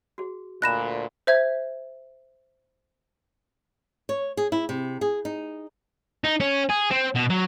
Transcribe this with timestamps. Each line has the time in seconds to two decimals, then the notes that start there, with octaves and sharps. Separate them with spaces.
0.18 F#4 G#4
0.62 D2 A#2 D#5 A5 B5 F#6 A#6 E7
1.27 C5 E5 G#6
4.09 C#5
4.37 G#4
4.52 E4
4.69 C3
5.01 G#4
5.25 D#4
6.24 D#4
6.40 C#4
6.70 G#4
6.91 C4
7.16 B2
7.30 F#3